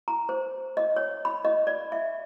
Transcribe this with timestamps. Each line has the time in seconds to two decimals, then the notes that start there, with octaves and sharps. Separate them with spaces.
0.08 A#5
0.29 C5
0.77 D#5
0.96 C#5
1.25 B5
1.45 D#5
1.67 D5
1.92 E5